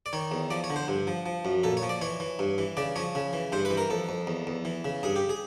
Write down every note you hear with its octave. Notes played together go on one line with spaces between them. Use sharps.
D5
D#3 C#5
E2
F3 D5
C#5
D3
C5
G2
F3
F3
F#2
A#2 A4
C#5
F3
D5
E3 C#5
E3
G2
E3
C#3 D5
F3 C#5
C#3
E3
G2 C5
B4
E3
A#4
F2 A4
F2
E2
E2
E3
C#3
G2 G#4
G4
G#4